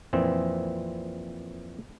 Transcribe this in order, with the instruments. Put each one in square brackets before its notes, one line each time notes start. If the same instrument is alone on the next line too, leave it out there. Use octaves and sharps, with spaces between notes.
[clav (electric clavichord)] F2 A#2 E3 C4